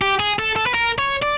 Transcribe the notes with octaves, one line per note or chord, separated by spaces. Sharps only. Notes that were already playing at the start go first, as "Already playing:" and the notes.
G4
G#4
A4
A4
B4
A#4
C#5
D5